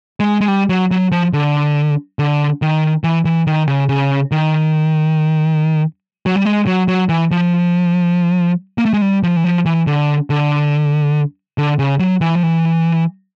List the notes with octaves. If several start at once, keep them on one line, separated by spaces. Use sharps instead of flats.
G#3
G#3
G3
F#3
F#3
F3
D3
D3
D#3
E3
E3
D#3
C#3
C#3
D#3
F#3
G3
G#3
F#3
F#3
E3
F3
A#3
A3
G#3
G3
F3
E3
F3
E3
D3
D3
D3
C#3
F#3
E3
F3
E3